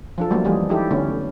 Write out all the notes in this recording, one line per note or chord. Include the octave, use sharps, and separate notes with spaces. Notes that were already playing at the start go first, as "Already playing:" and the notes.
F3 D4 A4
F#3 G3 A3 A#3 C#4
E3 F3 G3 G#3 G4 G#4
D#4 E4 G4 A4
D3 A3 B3 C#4